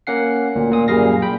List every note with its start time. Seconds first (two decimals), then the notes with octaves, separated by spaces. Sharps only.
0.07 A#3 C#4 F#5 C7
0.55 D2 A#2
0.71 A#2 D#6
0.88 F#2 A#2 G3 G#4 F5 A#6
1.22 G5 B5